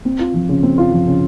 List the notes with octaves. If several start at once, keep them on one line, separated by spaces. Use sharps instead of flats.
C4
F4
F3
C#3
C4
F4
F3
C#3